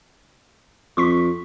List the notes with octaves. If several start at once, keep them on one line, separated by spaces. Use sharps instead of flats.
F2 C6 C#6 B6